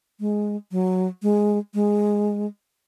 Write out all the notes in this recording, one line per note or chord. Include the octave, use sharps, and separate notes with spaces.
G#3
F#3
G#3
G#3